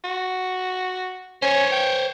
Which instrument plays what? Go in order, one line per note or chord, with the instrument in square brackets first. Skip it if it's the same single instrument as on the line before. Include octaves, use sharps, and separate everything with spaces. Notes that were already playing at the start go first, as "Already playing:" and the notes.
[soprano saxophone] F#4
[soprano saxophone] C#4 [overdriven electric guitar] C5 C#5
[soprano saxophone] G5